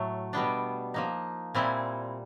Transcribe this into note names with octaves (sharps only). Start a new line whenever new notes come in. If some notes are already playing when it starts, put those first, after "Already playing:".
Already playing: A2 F#3 A3
B2 G3 B3 D4 G5
F3 A#3 D#4
A#2 G3 C4 E4 G#5